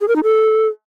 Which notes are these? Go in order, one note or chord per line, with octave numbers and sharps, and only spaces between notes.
G#4
A#4
D#4
A4